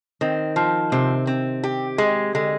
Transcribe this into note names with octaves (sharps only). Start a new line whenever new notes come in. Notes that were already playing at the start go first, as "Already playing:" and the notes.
D#3 C4
F3
C3 C4
C4
G4
G#3
D3 G#3